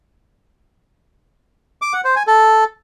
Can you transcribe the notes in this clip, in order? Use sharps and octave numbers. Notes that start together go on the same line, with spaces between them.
D6
F#5
C5
G#5
A4